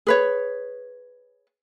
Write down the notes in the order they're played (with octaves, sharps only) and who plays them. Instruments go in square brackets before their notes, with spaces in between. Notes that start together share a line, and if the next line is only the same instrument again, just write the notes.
[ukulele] G#4 B4 C#5